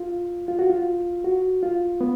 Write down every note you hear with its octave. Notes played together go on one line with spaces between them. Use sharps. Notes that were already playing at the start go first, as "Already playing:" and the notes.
Already playing: F4
F4
F#4
F4
F#4
F4
B3